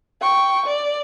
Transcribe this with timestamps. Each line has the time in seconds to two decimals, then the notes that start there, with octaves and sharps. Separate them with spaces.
0.21 G5 C#6
0.66 D5